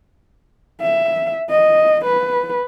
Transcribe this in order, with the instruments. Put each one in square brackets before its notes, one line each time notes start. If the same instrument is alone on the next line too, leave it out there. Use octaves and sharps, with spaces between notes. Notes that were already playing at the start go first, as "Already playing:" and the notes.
[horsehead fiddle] E5
D#5
B4